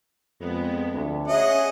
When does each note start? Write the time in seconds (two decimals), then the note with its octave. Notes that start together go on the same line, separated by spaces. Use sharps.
0.41 F2 G#3 B3
0.92 D2
1.28 C#4 G#4 D#5 E5 F#5